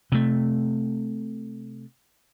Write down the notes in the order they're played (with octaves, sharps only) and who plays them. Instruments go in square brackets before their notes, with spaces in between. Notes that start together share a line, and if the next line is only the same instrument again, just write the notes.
[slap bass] C3 A3